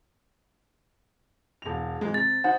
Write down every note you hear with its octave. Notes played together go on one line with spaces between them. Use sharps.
E1 F7
G#1 G#3
C3 A6
D#4 C5 F#5